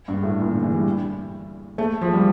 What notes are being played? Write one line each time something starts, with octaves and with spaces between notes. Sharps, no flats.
G2
A2
A#2
D3
E3
G3
A3
F3
G3